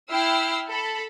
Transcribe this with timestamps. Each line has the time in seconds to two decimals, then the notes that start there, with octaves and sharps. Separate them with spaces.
0.11 E4 G5 E6 F6 C7
0.70 A4 B5